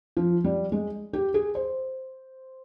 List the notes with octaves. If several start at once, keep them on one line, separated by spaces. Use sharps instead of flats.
F3
G3
G#3
G4
G#4
C5